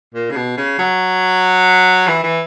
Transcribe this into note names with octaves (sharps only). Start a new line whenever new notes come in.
A#2
C#3
B2
C#3
F#3
E3
E3